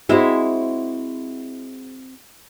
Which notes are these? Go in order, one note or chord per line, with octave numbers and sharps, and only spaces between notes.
G#3 C4 E4 F#4 C5 E5